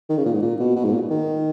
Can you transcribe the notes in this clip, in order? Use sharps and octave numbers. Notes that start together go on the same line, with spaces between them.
D#3
C#3
A#2
G#2
A#2
B2
B2
G#2
A#2
D#3